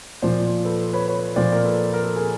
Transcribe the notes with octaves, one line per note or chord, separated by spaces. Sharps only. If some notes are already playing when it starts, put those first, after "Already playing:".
A#2 F3 C5 D5
A4 B4
B4 C#5
B4 C#5
A#2 F3 C5 D5
A#4
A4 B4
A#4
A4
G#4 A#4